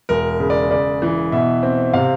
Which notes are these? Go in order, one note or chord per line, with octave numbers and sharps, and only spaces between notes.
E1 A#4
C#3
D5
C#3 D5
E3
B2 E5
C4
C3 F5